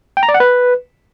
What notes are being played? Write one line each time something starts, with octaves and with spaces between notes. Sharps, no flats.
G5
A#5
D5
F#5
B4